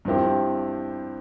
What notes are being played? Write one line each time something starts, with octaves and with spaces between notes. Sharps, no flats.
G2 F3 C4 E4 G4